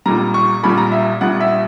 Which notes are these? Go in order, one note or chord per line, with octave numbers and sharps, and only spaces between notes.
A#1 A#2 G3 A#5
C#6
A#1 A#2 G3 B5
A#5
E5
A#1 A#2 G3 F#5
E5